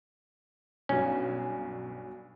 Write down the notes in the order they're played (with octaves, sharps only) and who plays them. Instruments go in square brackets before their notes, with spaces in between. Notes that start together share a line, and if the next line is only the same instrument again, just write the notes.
[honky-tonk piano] B1 G2 F#3 [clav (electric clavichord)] C#4